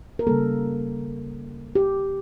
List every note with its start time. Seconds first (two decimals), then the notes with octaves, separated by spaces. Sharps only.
0.19 A#4
0.27 C#3 G3 A#3 A4
1.75 G4